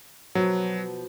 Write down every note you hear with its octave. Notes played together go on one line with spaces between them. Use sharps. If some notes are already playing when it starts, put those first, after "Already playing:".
B2 F3 F#3 B3